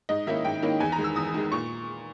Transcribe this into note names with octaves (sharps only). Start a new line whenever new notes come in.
G#2 D#5
D#3 A#3 C#4 E4 E5
G#2 G5
D#3 A#3 C#4 E4
E2 G#5
A#5
D#3 G#3
E6
E2 D#6
D#3 G#3
A#2 C#6